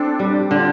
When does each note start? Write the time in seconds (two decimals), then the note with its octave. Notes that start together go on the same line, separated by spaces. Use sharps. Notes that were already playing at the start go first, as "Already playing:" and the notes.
Already playing: C4 D4 A4
0.19 G3
0.50 D3 F4